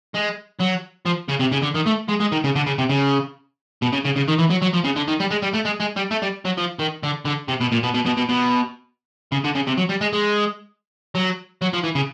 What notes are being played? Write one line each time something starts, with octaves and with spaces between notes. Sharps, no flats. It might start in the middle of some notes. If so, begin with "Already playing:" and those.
G#3
F#3
F3
C#3
C3
C#3
D3
D#3
A3
G#3
G#3
D#3
C#3
D3
C#3
C3
C#3
B2
C#3
C#3
C#3
D#3
E3
F#3
F#3
F3
C#3
D3
D#3
G3
G#3
G3
A3
G#3
G#3
G3
A3
G3
F#3
F3
D#3
D3
D3
C3
B2
A#2
B2
B2
B2
B2
B2
C#3
D3
C#3
C3
F#3
G3
G#3
G#3
F#3
F#3
F3
E3
C#3